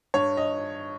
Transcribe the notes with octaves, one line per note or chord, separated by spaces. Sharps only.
G2 C#5
D#5